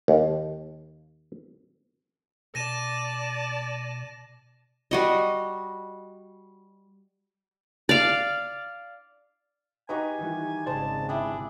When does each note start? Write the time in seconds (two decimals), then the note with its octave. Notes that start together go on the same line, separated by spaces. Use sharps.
0.08 D#2
2.55 B2 D5 A5 A#6 D#7 E7
4.91 G3 F#4 D#5
7.89 D5 F5
9.89 D#4 F#4 G4 B4 D#5 G#5 A#5
10.19 D#3 E3 G3
10.66 G#1 C#3 G#4 C5 D5 A5
11.09 D4 E4 G5 G#5 B5 D#6